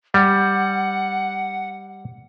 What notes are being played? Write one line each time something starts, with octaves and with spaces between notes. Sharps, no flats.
G3 F#5